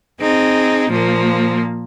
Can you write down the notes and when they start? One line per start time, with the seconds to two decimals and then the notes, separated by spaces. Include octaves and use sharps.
0.20 C4 D#4 G#4
0.89 A#2 F3 A#3